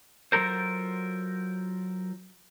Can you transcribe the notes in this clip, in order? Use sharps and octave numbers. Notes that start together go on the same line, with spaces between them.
F#3 F4 A4 A#4 C5